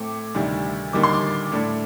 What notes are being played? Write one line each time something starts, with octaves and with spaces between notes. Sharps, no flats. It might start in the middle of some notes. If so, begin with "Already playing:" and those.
Already playing: A2 A3 C4 D6
D2 C3 D#3 G3 D4
D#2 D3 G3 A#3 D#4 D6
C6
D6
A2 A3 D4